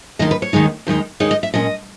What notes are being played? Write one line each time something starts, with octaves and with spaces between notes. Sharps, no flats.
D#2 D#3 G#3 D#4 D#5
B4
C#5
D#2 D#3 G#3 D#4
D#2 D#3 G#3 D#4
D#2 D#3 G#3 D#4 C#5
D#5
E5
A#2 G#3 C#4 D#5